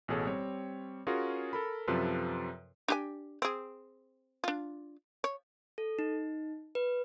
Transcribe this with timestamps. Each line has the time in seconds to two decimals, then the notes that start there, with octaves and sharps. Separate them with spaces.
0.08 A1 B2 G#4 A4 C#5
0.27 G3 C4 C#5
1.07 C#4 F4 F#4 G#4 A#4
1.53 A4 A#4 B5
1.88 F#2 C3 F3 F4 A4 B4
2.88 D4 G4 G#5
3.42 C4 G#4
4.44 D4 F4
5.24 C#5
5.78 A4
5.99 D#4
6.75 B4